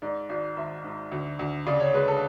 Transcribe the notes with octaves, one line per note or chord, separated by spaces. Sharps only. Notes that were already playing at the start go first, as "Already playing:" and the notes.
G#2 D5
G#1 D5
G#1 E5
G#2
D2
D2
C#3 D5
C#5
G#3 B4
A4